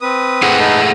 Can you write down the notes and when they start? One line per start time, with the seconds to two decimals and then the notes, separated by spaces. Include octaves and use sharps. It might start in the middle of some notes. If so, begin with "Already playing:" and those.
0.01 C4 B4 D#6
0.42 A3 G#4 F#5
0.59 D#4 A4 B4